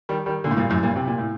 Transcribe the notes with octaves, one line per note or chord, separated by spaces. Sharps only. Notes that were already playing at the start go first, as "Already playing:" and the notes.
D#3 G3
D#3 G3
A#2 D3
A2
G2 A#2
F#2 A2
G2 A#2
C3
A#2
A2